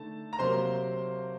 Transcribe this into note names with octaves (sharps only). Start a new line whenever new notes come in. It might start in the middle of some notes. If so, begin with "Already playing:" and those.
Already playing: D3 A3 D#4 A5
A#5
C3 F#3 A#3 C5 C6